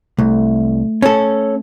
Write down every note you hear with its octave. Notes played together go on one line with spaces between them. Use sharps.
C2 A3
C#4 A4